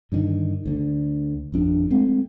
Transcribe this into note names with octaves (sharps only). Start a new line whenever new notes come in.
G2 D3 D#3
D2 D3
G#1 F2 D4
G#3 A3 C4